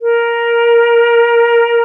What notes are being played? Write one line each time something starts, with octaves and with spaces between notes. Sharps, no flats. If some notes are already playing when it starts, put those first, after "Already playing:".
A#4